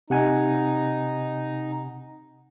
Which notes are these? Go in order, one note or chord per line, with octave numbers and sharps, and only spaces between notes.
C3 D#4 F#5 G#5